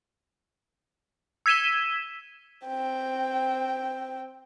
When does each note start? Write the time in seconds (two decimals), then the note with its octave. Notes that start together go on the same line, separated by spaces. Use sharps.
1.46 E6 G#6 B6 D#7 E7 G7
2.66 C4 G5